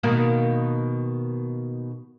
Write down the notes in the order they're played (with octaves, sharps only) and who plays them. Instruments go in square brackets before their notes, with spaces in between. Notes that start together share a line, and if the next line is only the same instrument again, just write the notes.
[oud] B2 D#3 A#3